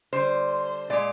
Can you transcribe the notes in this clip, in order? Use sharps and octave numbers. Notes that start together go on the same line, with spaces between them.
D3 G3 C5
A#2 G#3 D5